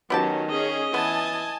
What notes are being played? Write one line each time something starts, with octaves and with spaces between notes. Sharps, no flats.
D#3 F#3 B3 C#4 G4 A5
C#4 G#4 D#5
E3 B3 G#5 A5